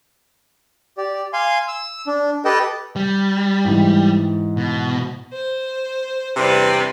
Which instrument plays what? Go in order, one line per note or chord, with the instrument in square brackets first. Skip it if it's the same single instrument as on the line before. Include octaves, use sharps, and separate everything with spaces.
[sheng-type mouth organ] G4 D5
F5 G#5 C6
E6
D4
G4 A4 B4 D#5 G5 A5
[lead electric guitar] G3
[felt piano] G#2 E3
[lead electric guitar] B2
[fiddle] C5
[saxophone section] E2 G2 C3 [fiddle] B4 D5